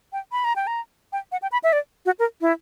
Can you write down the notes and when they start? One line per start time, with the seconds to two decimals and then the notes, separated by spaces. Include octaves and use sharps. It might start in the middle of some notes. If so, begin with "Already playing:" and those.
0.13 G5
0.32 B5
0.44 A#5
0.56 G5
0.67 A#5
1.13 G5
1.32 F#5
1.42 G5
1.52 B5
1.64 E5
1.73 D5
2.06 F#4
2.19 A#4
2.41 E4